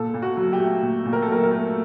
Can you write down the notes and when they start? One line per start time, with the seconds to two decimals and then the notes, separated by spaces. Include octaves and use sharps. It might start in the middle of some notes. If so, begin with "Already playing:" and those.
Already playing: A#2 A4
0.14 A#2
0.22 F#4
0.37 F#3
0.53 G4
0.60 A3
0.82 A#2
1.05 A#2
1.13 A#4
1.22 A4
1.28 F#3 A#4
1.43 A#4
1.51 A3